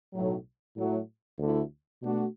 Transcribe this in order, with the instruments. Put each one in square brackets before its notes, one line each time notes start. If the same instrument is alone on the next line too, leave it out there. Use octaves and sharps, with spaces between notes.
[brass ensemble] B1 A2 F#3
A2 F#3 A3
D2 D3 A3 E4
B2 A3 D4 F#4